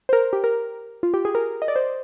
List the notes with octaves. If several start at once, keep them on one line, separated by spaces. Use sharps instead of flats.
C5
A#4
G4
A#4
F4
G4
G#4
A#4
D#5
D5
C5